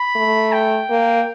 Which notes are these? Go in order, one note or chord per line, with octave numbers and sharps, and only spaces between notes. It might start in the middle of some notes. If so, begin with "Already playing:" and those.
Already playing: B5
A3
G5
A#3